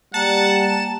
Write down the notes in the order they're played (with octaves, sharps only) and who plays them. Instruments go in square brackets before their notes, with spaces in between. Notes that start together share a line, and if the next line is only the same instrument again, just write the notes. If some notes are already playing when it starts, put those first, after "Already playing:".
[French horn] G3 [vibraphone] A#3 G5 A#5 [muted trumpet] F#5 [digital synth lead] A5